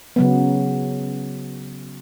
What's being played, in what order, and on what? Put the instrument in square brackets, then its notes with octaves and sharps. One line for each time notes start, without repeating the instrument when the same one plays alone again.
[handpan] C#3 F#3 B3